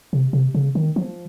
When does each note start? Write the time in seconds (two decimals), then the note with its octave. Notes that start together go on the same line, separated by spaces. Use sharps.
0.13 C3
0.33 C3
0.55 C#3
0.75 D#3
0.96 F3